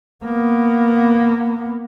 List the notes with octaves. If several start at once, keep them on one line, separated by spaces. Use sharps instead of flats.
A#3 B3